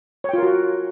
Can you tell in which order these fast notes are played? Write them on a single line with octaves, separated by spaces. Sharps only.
C#5 G5 F4 A#4 F#4